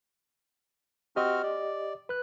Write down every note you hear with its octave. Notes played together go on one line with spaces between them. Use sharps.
C4 F#4 G4 D#5 F6
D5
B4 F#6